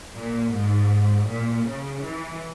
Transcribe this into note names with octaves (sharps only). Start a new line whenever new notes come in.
A#2
G#2
A#2
C#3
E3